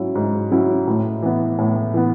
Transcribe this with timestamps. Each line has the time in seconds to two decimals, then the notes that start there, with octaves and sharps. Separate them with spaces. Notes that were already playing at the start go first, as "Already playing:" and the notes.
Already playing: G#2 F#3 C#4 E4
0.15 G#2
0.51 F#3 C#4 E4
0.87 A2
1.22 E3 B3
1.59 A2
1.94 E3 B3